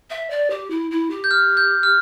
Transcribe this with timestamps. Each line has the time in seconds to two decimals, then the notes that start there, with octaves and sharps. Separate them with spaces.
0.10 E5
0.30 D5
0.50 G4
0.70 E4
0.91 E4
1.10 G4
1.24 G6
1.31 F6
1.57 G6
1.83 F6